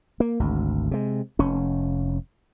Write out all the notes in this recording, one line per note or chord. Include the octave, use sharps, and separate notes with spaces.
A#3
G#1 D2
C3 G#3
F1 C#4